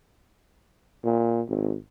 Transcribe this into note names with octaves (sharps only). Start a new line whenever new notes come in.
A#2
G#1